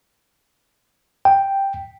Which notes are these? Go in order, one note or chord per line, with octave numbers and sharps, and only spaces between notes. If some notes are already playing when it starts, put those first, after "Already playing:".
G5